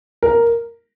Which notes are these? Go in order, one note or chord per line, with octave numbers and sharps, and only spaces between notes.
A#4